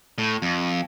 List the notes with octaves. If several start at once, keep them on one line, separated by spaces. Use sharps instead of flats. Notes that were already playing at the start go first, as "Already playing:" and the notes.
A2
F2